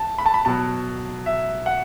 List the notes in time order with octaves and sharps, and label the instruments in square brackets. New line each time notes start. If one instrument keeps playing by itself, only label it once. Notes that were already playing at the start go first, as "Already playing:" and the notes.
Already playing: [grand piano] A5
B5
A5
B5
B2 F#3 A5
E5
F#5